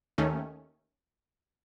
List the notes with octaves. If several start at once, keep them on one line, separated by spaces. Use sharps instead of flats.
D#2 D#3 A3 C#4